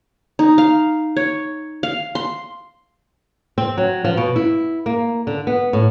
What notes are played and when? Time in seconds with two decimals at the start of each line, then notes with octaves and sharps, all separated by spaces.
0.39 D#4
0.58 F5
1.17 C#5
1.83 F5
2.15 C6
3.58 C4
3.78 F#3
4.05 F3
4.17 B2
4.36 E4
4.86 A#3
5.27 D3
5.47 B3
5.73 A2